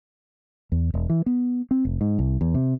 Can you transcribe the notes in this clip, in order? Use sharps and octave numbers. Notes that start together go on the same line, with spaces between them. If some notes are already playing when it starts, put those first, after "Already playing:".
E2
E1
E3
B3
C4
F1
G#2
C2
E2
C3